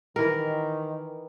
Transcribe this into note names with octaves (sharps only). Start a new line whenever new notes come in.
D#3 E3 A#4